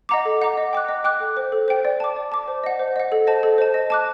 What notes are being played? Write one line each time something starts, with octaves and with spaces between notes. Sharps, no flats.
D#5 F#5 A#5 D6
A4
D#5 F#5 A#5 D6
D#5
G5 D6 F#6
D#5
G5 D6 F#6
A4
C5 G5
A4
C5 G5
D5
A5 D6
D5
A5 D6
C5
D#5 F#5
C5
D#5 F#5
A4
C5 D#5 A5
A4
C5 D#5 A5
D#5
A5 D6 F#6